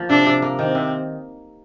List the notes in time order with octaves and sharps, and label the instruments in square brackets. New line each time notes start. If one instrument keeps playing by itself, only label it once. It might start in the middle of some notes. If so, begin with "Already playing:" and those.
Already playing: [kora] F3 A#3
[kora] C3 [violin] D4
[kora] C3
A#3
[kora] D#3 [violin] C4
[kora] C3